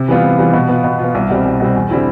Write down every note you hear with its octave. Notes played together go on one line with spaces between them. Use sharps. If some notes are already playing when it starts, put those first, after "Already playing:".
Already playing: C3
E3 G3 B3 F4
C3
E3 G3 B3 F4
B2
B3 F4
B2
B3 F4
C2
B2 G3 C4
C2
B2 G3 C4
E2
D3 G3 C4 E4